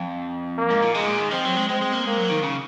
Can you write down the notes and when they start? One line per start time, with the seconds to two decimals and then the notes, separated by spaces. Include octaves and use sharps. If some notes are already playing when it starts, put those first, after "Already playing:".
Already playing: F2
0.58 A#3
0.70 G#2
0.82 A#2
0.94 C3 G#3
1.03 G#2
1.06 A#2
1.19 D#3
1.31 F3 C4
1.45 F#3
1.57 G#3
1.69 G#3 C4
1.82 G#3
1.93 A#3
2.06 G#3 A#3
2.19 F#3
2.31 D#3
2.43 C#3